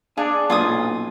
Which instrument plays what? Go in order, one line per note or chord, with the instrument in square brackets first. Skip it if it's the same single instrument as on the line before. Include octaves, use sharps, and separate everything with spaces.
[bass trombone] D4 [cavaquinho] G#4 [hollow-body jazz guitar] F5 G#5
[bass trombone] B1 [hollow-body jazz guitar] F#2 A#2 [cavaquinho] F4 G#5 D#6